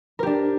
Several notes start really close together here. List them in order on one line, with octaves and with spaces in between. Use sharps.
A#4 G4 D4